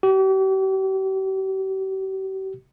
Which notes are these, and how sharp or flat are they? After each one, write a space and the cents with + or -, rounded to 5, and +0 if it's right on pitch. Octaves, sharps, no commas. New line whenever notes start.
G4 -40